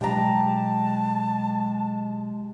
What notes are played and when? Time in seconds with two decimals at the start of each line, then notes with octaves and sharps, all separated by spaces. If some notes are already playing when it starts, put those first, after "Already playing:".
0.01 B2 F#3 G#3 G4 A5 A#5